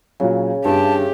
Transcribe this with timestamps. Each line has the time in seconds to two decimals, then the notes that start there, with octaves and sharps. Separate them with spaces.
0.20 A#2 C#3 F#3
0.65 G2 G4 E5 A5